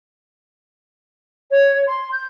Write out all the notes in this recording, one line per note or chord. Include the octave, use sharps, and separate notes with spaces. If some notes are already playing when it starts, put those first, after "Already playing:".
C#5
C6
G6